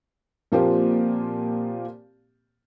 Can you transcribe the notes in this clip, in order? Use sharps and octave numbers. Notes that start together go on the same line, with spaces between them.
A#2 F3 A#3 C4 G4